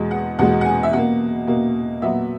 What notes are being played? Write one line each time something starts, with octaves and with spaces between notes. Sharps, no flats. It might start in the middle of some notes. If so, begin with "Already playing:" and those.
Already playing: E2 B2 G#3
F#5
E2 B2 G#3 F#5
F#5
G#5
E5
B2 A#3 F#5
B2 A#3
A#2 F#3 B3 E5